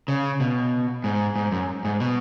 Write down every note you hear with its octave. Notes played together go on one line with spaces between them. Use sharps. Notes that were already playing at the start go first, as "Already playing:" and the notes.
C#3
B2
G#2
G#2
F#2
G#2
B2